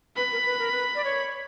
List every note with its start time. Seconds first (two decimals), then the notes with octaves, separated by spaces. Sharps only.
0.17 B4 B5
0.32 A#4
0.46 B4
0.59 A#4
0.72 B4
0.95 D5
1.04 C#5